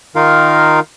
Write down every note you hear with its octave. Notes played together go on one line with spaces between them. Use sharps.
D#3 D#4 F4 A#4 F5